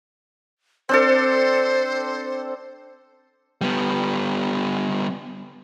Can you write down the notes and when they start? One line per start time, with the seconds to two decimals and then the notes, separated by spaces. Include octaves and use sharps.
0.89 C4 D4 A4 C5
3.61 G3 B3